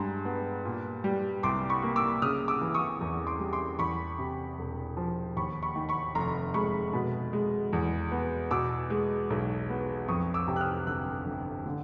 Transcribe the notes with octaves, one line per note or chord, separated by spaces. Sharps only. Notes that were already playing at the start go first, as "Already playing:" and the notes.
Already playing: G2 G#3 G#5 A#5 C6
B3
A#2
G3
C2 C6 D6
B5 C#6
A#3
D6 E6
C#3 D#6 F6
D6 E6
E3
C#6 D#6
E2
C6 D6
G3
C6 D6
E2 B5 C#6
C3
E1
F3
D#2 B5 C#6
B5 C#6
D#3
B5 C#6
F1 A#5 C6
G#3 B5 C#6
B2
G#3
E2
B3
B2 D6 E6
G#3
B1
B3
F2 C#6 D#6
D6 E6
C3
F#6
D#6 F6
G1 E6 F#6
G1
D3